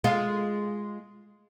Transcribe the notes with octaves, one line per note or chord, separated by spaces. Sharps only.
G#3 F4